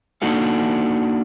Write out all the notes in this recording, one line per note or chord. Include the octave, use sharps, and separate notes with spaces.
A#3 D4 D#4 F#4 A4 F5